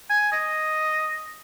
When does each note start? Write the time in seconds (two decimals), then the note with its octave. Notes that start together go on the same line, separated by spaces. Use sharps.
0.10 G#5
0.32 D#5